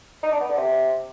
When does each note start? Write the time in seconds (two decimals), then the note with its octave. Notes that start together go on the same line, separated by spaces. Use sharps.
0.23 D#4
0.32 D4
0.40 B3
0.49 D3
0.57 C3